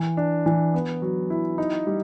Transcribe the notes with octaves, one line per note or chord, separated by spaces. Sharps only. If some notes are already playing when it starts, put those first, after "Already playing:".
Already playing: E3
D4
E3
B3
F#3
E4
D#4
G3